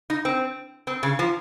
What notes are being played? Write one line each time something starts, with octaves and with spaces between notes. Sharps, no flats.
D#4
C4
C4
C#3
F3